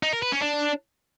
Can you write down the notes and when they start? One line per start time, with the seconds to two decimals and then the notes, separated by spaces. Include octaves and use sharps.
0.03 D#4
0.13 A#4
0.22 B4
0.32 C#4
0.42 D4